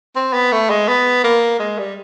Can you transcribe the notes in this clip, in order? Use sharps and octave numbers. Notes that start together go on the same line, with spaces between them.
C4
B3
A3
G#3
B3
A#3
G#3
G3